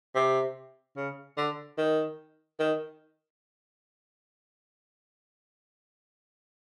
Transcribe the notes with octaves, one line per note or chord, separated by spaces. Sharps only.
C3
C#3
D3
D#3
D#3